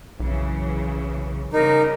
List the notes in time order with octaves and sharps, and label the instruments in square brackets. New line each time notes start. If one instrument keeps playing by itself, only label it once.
[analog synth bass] B1 [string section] F#2 C#3 E3
[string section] C#3 G3 [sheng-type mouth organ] D#4 [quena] A#4